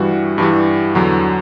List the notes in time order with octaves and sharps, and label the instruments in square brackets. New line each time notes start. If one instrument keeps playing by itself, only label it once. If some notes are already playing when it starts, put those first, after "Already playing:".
Already playing: [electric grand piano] G2 E3 G3 F#4
G2 E3 G3
E2 D3 F#3